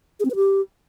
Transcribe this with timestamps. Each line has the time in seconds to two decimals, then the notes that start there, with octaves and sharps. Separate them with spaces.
0.20 G#4
0.25 C4
0.30 B4
0.36 G4